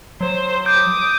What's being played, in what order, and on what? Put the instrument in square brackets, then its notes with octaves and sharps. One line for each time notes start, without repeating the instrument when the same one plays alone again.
[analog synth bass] F#3 [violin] C5
[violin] D6 D#6 [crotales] G6